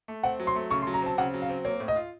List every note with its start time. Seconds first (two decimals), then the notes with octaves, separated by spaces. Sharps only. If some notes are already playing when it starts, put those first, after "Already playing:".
0.08 A3
0.23 C4 F#5
0.40 F#3
0.47 C6
0.56 A3
0.71 C#3 C#6
0.82 C6
0.87 F#3
0.94 A#5
1.02 C4 A5
1.18 C#3 F#5
1.34 F#3
1.42 F5
1.49 C4
1.65 A#3 C#5
1.80 A2
1.88 D#5
1.96 F4